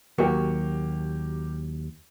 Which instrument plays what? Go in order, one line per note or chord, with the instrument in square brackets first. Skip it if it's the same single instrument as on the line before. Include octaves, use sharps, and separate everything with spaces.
[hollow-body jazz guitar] D#2 F#3 F#4 [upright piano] A#3 G4